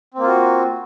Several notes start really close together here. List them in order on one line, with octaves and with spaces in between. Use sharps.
C4 A#3 F4 F#4